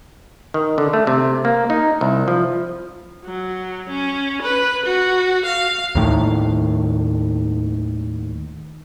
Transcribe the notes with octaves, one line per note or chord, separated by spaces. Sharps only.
D#3
D3
A3
C3
A#3
D#4
C2
F3
F#3
C#4
B4
F#4
F5
D#2 A2 D#3